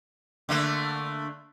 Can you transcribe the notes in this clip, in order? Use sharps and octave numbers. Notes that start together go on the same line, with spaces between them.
D3 A3 A#3